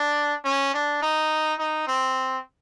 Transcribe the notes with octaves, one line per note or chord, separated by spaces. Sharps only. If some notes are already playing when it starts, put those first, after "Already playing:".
Already playing: D4
C#4
D4
D#4
D#4
C4